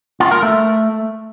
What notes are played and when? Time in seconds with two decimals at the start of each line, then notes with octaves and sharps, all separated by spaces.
0.20 F4
0.31 A#4
0.43 A3